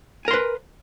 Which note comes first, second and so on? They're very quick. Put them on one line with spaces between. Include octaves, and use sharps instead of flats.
G#5 A#4 C6 B4